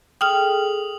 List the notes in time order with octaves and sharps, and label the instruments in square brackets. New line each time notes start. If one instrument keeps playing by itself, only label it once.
[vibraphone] G#4 A4 [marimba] G5 F6 [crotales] D#6 F#7